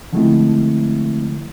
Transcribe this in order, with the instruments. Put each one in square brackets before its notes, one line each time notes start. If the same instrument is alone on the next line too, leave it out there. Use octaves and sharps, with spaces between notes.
[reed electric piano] D3 F3 G#3 A3 C4 E4